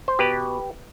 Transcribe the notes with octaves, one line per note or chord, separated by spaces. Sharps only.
C5
B2 G4 B4